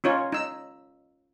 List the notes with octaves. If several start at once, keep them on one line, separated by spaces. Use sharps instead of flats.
C#4 D#4 F4 C#5
D#4 E6